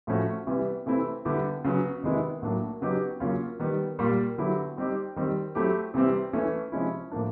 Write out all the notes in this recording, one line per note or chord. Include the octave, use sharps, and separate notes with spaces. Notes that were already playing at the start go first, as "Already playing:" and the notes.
A2 F3 A3 C#4 F#4
C3 E3 G3 B3
C3 E3 A3 C4 E4
D3 G3 B3 E4 G4
C#3 F#3 B3
C3 D#3 G#3 B3 E4
A2 F#3 A#3 D4
C#3 F#3 B3 D#4 G4
C#3 F#3 A#3 C#4 F4
D#3 G3 B3
A#2 G3 A#3
D3 F#3 B3 E4 G4
G3 C4 D#4 G4
D#3 G3 C4
F#3 A3 C4 E4 G4
C3 E3 G3 C4
E3 A3 C#4
C3 F3 G#3 C#4 E4
A2 F3 A#3 D4